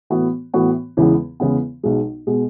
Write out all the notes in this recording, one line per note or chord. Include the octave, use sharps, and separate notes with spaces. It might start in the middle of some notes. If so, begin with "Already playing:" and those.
A2 E3 B3 F#4
A2 E3 B3 F#4
E2 C#3 E3 G#3 B3
E2 C#3 E3 G#3 B3
B1 B2 G#3
B2 G#3